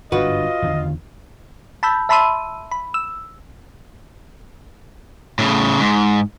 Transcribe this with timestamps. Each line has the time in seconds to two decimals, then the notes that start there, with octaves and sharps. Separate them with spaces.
0.12 G1 G#2 D4 F4 F#4 B4 D#5
0.62 E2 D3 D#3
1.83 A5 B5 E6 G6
2.09 E5 A5 B5 C6 E6 D#7
2.71 B5
2.94 E6
5.39 A2 C#3
5.80 G#2